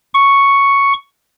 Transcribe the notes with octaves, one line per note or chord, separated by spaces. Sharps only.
C#6